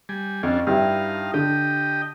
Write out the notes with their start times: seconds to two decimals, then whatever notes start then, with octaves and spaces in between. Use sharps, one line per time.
0.09 G3 G#5
0.43 F2 C#4 D4 F4
0.67 G2 D#4 E4 F5
1.34 D3 G4 D#5 G5